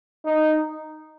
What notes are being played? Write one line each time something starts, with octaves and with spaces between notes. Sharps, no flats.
D#4